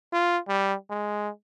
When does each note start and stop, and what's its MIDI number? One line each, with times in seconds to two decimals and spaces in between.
0.13 0.38 65
0.48 0.74 55
0.90 1.29 56